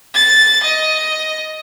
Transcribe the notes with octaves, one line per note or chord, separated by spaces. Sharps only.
A6
D#5